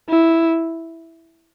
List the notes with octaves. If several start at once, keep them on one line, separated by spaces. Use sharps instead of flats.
E4